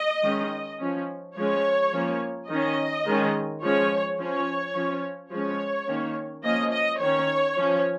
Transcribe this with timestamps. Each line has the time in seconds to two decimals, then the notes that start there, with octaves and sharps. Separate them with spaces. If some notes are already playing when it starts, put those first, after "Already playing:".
Already playing: D#5
0.23 D#3 G#3 C#4
0.79 F3 C#4
1.36 F3 G#3 C#4 C#5
1.93 F3 A#3 C#4
2.49 D#3 C#4 D#5
3.06 D#3 G#3 C#4
3.62 F3 G#3 C#4 C#5
4.19 F3 C#4 C#5
4.74 F3 C#4
5.31 F3 G#3 C#4 C#5
5.88 D#3 A#3 C#4
6.44 F3 A#3 C#4 D#5
6.72 D#5
7.00 D#3 C#4 C#5
7.57 F3 C#4